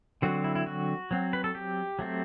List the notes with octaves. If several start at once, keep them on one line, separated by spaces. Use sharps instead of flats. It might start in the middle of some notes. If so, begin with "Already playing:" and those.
D3 F#3 C4 F#4
E4
E4
F#4
F#3 C4
B4
A4
G4
F#3 A3 C4